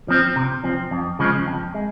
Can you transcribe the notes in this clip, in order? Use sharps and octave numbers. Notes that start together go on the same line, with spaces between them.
F3 C4
C3
F3 C4
F2
C#3 F3 G#3
F2
G#3